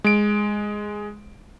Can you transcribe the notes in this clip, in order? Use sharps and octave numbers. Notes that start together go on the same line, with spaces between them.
G#3 D7